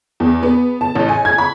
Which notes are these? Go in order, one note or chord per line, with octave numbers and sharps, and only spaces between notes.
E2
B3
A5
A1
G#5
G#6
B5